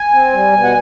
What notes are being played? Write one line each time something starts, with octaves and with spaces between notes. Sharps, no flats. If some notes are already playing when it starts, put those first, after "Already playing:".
Already playing: G#5
C4
G3
B2
F#5